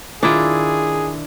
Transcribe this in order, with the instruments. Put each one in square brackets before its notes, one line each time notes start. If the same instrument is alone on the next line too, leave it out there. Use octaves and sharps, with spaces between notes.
[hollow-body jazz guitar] D#3 F4 [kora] D4 E4 [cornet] G#4